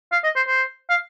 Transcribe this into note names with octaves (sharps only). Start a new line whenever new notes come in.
F5
D#5
C5
C5
F5